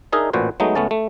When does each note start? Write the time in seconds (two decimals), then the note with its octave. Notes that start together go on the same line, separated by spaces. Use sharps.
0.12 D4 D#4 G#4 A#4 D#5 E5
0.33 A1 A#2 F#4 B4 C5
0.60 F#3 G#3 A3 B3 D#4
0.75 C#2 A3 B3 C#4 A5
0.91 A3